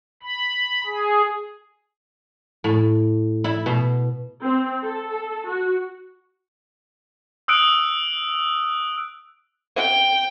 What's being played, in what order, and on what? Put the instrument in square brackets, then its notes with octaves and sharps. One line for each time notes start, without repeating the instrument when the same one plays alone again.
[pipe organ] B5
G#4
[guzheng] A2
E4
B2
[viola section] C4
A4
F#4
[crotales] D#6 E6 F#6 D7
[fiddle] G5